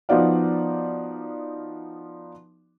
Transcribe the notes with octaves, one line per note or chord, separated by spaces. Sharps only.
F3 B3 D#4 F#4 D5 F5